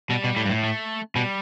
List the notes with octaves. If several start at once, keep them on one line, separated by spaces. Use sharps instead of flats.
B2 G3
B2
A2
G2
A2
A3
B2 G3